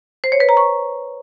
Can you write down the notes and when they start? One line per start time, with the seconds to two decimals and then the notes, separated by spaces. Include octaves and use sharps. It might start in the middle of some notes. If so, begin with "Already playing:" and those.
0.24 C5
0.32 C#5
0.40 B4
0.49 A#5
0.57 C#6